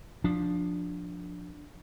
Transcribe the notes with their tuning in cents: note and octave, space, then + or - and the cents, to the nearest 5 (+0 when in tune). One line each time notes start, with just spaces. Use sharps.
F3 +15 D4 +0